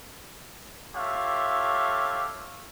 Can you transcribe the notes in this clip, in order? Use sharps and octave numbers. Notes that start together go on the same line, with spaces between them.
F4 G4 A4 C#5 E5 F5